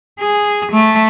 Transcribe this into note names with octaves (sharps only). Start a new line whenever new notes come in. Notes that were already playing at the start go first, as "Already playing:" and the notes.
G#4
A3